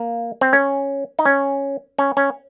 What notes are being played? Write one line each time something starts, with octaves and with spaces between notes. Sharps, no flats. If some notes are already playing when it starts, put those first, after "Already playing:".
Already playing: A#3
C4
C#4
D#4
C#4
C#4
C#4